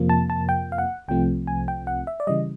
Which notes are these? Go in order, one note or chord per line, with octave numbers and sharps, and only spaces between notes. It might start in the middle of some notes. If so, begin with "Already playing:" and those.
Already playing: F2 C3 F3 A#3
A5
A5
G5
F5
F#5
C2 C3 F3 A3 C4 G5
G#5
G5
F#5
E5
D5
C#3 E3 G3 D#5